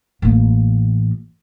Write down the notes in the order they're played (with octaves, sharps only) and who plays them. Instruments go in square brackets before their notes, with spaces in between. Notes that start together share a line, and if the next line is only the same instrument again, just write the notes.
[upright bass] A1 A#3